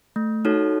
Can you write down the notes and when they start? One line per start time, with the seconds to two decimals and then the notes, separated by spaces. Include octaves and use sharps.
0.16 A3
0.45 D#4 F#4 A4 C#5